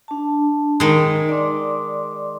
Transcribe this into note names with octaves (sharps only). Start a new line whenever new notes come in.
D4 A5
D#3 G#3 D#4
D5 C6 D6